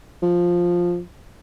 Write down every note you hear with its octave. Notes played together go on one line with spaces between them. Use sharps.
F3